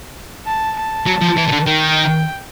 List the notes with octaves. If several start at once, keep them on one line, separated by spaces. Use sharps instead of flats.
A5
A5
F#3
F3
E3
D#3
D3
D#3 G5